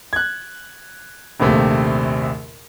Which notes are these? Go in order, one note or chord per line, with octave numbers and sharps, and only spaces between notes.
F#6 G#6
A#1 D#2 C3 A3